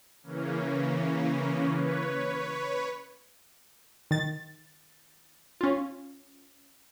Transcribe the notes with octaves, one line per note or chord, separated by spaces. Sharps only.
C#3 E3 A#3 C#4
B4 C#5
D#3 A6
C#4 F4